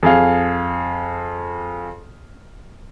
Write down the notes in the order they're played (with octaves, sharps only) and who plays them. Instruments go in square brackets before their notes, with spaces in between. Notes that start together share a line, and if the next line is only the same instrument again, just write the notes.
[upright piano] F2 G#4 F5